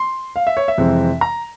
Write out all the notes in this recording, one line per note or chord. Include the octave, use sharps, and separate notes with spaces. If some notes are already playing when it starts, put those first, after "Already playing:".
Already playing: C6
F5
E5
C#5
E5
F2 C3 E3 G#3 C4
A#5